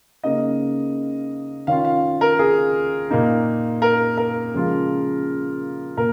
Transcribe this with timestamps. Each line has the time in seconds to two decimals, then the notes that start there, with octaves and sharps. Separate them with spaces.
0.23 C#3 A#3 D#4 D#5
1.67 D#3 C#4 F4 F5
1.85 F5
2.21 A#4
2.39 G#4
3.10 A#2 A#3 D#4
3.82 A#4
4.17 A#4
4.54 C#3 F3 G#3 F4
5.97 A#2 A#4